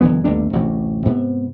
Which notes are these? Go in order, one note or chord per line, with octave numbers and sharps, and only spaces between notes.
F#1 D3 E3 B3
G1 D#2 A3 D4
A1 D2 C3
G#2 C3 B3